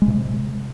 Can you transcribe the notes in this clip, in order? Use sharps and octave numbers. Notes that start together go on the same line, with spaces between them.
G#3
B2
C3